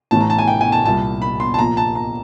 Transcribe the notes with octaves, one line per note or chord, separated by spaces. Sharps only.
A1 A2 E3 A5
A#5
A5
G#5
G5
G#5
A5
C2 A#2 A5
B5
C6
A5
A#1 A#2 A#5
A5
A#5